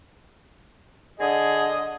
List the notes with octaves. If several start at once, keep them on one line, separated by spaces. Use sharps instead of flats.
D3 G#4 D#5